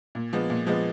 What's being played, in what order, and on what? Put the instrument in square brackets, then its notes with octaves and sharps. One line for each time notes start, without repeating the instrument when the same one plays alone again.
[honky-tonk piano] A#2
F3 G#3 B3
A#2
F3 G#3 B3